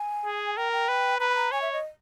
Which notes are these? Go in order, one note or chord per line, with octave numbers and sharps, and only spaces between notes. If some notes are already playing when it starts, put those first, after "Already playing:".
Already playing: G#5
G#4
A#4 G5
G5
B4
B4 A#5
B5
A#5
C#5 G#5
E5
D#5